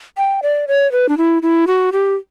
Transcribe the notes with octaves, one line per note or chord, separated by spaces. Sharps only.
G5
D5
C#5
B4
D4
E4
E4
F#4
G4